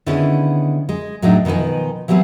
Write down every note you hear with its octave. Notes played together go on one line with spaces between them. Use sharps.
D3 D#3 B3 C#4 E4 G#4
G#3
A2 F#3 G#3 D4 D#4
B2 D#3 F3 B4 G#5
E3 F#3 G3 B3 C4